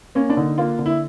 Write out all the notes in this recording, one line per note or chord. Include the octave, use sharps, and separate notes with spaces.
A#3 C#4
D4
D3 D#4
A#3 F4
D3
E4